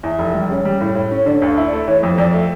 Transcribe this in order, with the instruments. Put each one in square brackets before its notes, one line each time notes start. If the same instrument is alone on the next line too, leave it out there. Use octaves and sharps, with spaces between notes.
[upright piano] E2 [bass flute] E5
[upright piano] F1
G3
C#3
G3
A2
A2
C#4
[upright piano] D3 [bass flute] D5
[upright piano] D2
[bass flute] F5
[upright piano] E4
[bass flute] D5
[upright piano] A3
[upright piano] E3 [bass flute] C#5
[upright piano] F2
[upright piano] F2 [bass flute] D5
[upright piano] A3